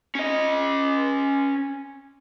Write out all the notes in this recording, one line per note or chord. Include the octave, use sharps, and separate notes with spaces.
C#4 D#5